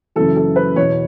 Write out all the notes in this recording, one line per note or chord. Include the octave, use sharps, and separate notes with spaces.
F#2 C#3 E3 A4
A4
B4
E2 B2 C#5